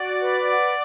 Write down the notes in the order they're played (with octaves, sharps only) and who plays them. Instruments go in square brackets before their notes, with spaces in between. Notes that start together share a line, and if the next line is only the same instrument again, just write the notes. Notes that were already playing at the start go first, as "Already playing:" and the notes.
Already playing: [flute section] F#4 [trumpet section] D5
[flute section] B4
F#5